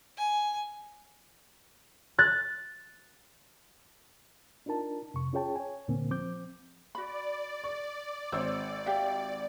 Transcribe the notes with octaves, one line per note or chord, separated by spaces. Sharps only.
G#5
F#6 A6
D4 D#4 F4 A#4 A5
F2 C3 C#6
C#4 F4 G#4 C#5 G5 A5
C#5 G#5
D#2 A#2 D3 A#3 C4
F3 C4 D6 G6
F#4 D5 B5
C#6
G#1 C5 C#5 E6
G4 E5 F5